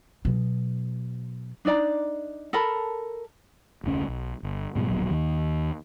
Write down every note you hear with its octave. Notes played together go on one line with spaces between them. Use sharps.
B2 F#3
D4 D#4 D5 A#5
A4 A#4 A5 B5
F1 D2 C#4
B1
G1
G#2 B2 D#3 G3
D#1 A#1 B2 F#3
D#2 D#3